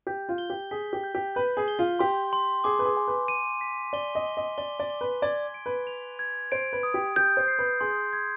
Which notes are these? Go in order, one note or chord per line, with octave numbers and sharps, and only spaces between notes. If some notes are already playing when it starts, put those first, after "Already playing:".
G4 G6
F4
G7
G4
G#4 B6
G4
G6
G4
B4 G6
G#4
G7
F4
G4 C6
C6
G#4 D6
B4
G#4
G#5
B4
D#7
B6
D5 G7
D#5
G7
D#5
D5 G7
D5
G7
B4
D5 G#6
D7
B4
F7
G#6
C5 D7
B4
D#6
G4
G4 G6
C5
C7
B4
G#4 C6
G#6